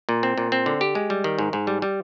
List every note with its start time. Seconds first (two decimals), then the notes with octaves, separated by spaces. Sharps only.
0.09 A#2
0.23 C4
0.38 A#2
0.52 C4
0.66 D3
0.81 G4
0.95 G#3
1.10 G3
1.24 D#3
1.39 G#2
1.53 G#2
1.67 G3
1.82 G3